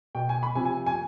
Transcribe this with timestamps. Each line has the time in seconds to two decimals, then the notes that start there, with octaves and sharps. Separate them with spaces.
0.15 B2 G5
0.29 G#5
0.43 B5
0.55 C3 F3 G#5
0.65 G#5
0.86 G#5